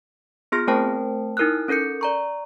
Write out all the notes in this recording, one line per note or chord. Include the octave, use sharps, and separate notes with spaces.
B3 F4 G#4 C6 F6 A#6
A3 C4 A#4 C5 G5 A5
D#4 E4 A#4 D#6 F6 F#6
C#4 A4 A#4 G6 C#7
D5 A#5 C#6